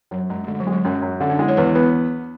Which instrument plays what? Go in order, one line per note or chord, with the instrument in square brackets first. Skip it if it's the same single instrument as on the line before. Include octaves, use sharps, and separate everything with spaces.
[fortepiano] F#2 [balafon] F#3
[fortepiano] F#2 [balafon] G#3
[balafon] A3
[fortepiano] D3 [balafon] G#3
[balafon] F#3
[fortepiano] G#3
[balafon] F#3
[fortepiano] F#2 [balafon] C#4
[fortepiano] F#2
[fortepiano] D3 [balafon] C#4
[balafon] D4
[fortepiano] G#3 [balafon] E4
[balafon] C#5
[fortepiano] E2 [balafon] B4
[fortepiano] B3 [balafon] B4